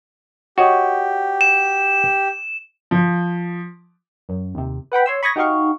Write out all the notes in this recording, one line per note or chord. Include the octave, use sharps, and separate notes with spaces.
F#4 G4 C#5 D#5
E7
F3
F#2
D#2 C3
B4 F#5 G5 B5
C#5 C6 E6
B5 C#6 D#6 G#6 A#6
D#4 F#4 G4 D#5 F5 C#6